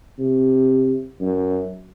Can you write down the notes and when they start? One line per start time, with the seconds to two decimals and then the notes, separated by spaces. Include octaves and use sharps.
0.19 C3
1.21 F#2